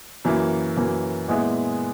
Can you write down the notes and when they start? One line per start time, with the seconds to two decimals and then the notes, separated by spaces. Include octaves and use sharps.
0.24 F#2 E3 A#3 E4
0.77 F#2 E3 A#3
1.28 A#2 G#3 B3 E4 G#4